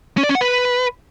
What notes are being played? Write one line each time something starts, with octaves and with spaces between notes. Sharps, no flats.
C#4
D5
C#4
F#5
B4